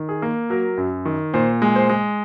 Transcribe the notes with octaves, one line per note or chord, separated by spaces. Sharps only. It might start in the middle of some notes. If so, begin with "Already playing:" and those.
Already playing: D#3
G#4
A#3
F#3 A#4
F#2
D#3
A#2 C5
G#3
C5
G#3